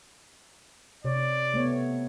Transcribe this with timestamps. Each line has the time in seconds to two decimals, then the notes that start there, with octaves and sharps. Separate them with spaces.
1.05 C3 C#5 D5
1.54 A3 B3 C#5